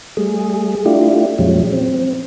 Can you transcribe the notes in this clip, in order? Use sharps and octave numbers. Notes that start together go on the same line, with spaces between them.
G3 A3 G#4
A3 D4 E4 F4 G4
F2 A#2 F3 F#3 G#3 C#4
C4